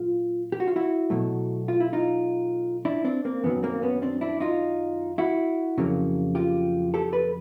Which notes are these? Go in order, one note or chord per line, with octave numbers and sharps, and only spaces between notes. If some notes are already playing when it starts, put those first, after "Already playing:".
Already playing: A#2 F#3 F4
G4
F#4
F4
E4 F#4
B2 F#3 A3
F4
E4
D#4 F4
D4 E4
C4 D4
A#3 C4
F#2 D#3 F#3 B3
A#3 C4
B3 C#4
C4 D4
D4 E4
D#4 F4
E4 F#4
F2 C#3 F#3 A#3
F4 G4
G4 A4
A4 B4